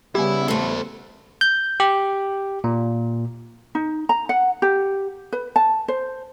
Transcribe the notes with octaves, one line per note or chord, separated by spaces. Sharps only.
C#3 G3 B3 E4 G4 G#5
A2 A3 A4 C5
G6
G4
A#2
D#4
A#5
F#5
G4
B4
A5
C5